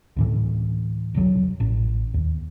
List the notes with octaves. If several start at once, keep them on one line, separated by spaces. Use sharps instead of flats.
D2 A2 E3
E1 C2 F#3
A1
D#2